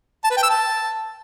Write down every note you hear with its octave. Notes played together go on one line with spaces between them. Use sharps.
A5
B4
G5
E6
A5